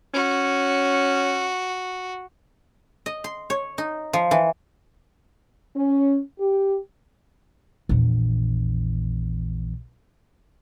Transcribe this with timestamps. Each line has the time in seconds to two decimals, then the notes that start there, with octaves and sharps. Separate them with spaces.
0.14 C#4 F#4
3.06 D#5
3.24 C6
3.50 C#5
3.78 D#4
4.13 F3
4.31 E3
5.76 C#4
6.40 G4
7.89 A#1 E2